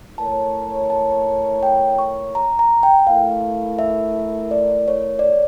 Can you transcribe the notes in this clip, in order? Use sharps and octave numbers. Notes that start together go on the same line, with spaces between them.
A3 E4 A#4 C#5 A5
A5
G5
C#6
A#5
A#5
G5
A3 E4 A#4 F5
E5
D5
C#5
D5
C#5